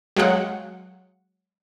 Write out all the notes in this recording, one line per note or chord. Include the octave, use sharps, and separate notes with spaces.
F#3 G#3 F5 F#5